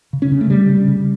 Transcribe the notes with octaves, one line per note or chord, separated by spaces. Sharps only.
C#3
C#4
C#3
A3
C#3 G3
C#3
C#3